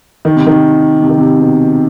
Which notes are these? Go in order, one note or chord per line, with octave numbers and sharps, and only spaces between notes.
D#3
C3
D#3
C3
D#3
C3
B2